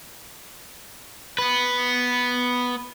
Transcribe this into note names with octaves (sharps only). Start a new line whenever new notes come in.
B3 B4